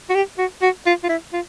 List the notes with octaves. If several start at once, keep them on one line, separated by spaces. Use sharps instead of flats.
F#4
G4
F#4
F#4
F4
F4
E4
F4